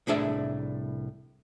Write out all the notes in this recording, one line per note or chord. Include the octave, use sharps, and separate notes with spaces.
C2 A2 D4 G#4 D5 E5